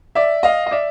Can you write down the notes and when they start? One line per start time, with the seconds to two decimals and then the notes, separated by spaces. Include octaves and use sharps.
0.15 D5 E5
0.43 D#5 F5
0.66 D#5
0.71 D5 E5